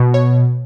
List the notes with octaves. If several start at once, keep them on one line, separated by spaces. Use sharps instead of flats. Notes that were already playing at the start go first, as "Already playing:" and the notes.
Already playing: B2
C#5